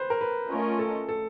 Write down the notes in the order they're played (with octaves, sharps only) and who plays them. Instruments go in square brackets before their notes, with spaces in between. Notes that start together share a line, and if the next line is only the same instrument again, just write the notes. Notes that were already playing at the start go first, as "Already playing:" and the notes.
Already playing: [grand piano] B4 C5
A#4
B4
[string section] A3 C#4 F4 A#4 D#5
[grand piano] A4
A4